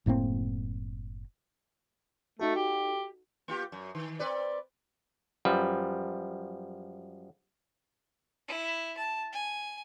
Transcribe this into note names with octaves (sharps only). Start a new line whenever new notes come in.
F#1 A2 A#3 C4
A3 D#4 F#4 A4
G4
A#3 F4 G4
F#2
D#3
C4 B4 D5
F#2 F3 G3 B4
E4
A5
G#5